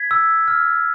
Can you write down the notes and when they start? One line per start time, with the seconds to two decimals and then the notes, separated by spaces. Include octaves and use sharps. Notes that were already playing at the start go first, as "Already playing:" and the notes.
Already playing: G#6 B6
0.11 E6
0.48 F6